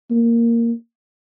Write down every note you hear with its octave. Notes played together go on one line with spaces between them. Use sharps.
A#3